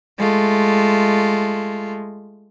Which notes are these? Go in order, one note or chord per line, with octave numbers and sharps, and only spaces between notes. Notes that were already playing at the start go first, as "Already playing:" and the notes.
G#3 A3 F4